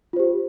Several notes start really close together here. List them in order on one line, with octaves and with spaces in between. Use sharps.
F4 C5 G4